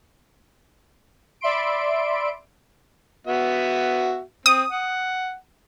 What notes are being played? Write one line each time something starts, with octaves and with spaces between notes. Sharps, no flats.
D5 E5 B5 C6 D7
B3 F#4 E5
C4 D#6
F#5